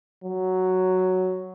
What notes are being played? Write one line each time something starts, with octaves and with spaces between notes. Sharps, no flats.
F#3